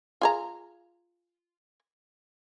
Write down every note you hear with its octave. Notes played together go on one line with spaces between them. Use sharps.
F4 G#4 A#5